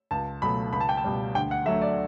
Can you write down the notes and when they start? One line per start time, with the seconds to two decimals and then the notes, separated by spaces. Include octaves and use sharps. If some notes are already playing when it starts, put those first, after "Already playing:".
0.11 C#2 A5
0.42 B2 F#3 A3 B5
0.73 C#2 B5
0.80 A5
0.89 G5
0.97 A5
1.04 B2 G3
1.35 D2 G5
1.51 F#5
1.65 D3 F#3 A3 E5
1.82 D5